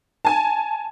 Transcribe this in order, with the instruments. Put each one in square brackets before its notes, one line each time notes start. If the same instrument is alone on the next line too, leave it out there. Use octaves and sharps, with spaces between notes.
[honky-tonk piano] G#5 A5